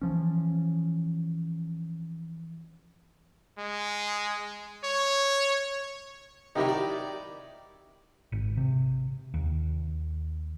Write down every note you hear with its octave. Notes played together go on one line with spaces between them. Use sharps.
E3 F3 C#4
G#3
C#5
C3 D#3 F#3 D#4 E4 G4
D5
G#1
C3
D#2